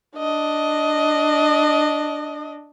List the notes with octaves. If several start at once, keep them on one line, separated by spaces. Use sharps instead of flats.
D4 D#5